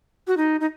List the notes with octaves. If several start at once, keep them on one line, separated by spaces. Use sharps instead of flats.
F#4
D#4
D#4